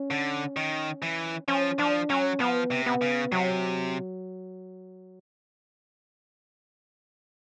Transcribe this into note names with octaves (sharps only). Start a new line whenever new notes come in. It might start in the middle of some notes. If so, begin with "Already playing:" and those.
Already playing: C#4
D3
D#3
E3
F3 C#4
F3 D4
F#3 C#4
F3 B3
C3
B3
C#3
C3 F#3